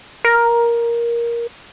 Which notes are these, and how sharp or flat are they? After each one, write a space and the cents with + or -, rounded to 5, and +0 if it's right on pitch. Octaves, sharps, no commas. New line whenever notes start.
A#4 +10